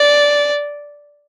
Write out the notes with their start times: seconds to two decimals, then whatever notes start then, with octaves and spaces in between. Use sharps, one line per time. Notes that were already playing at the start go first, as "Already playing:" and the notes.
Already playing: D5